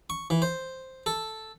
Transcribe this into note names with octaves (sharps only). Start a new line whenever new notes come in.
C#6
E3
C5
A4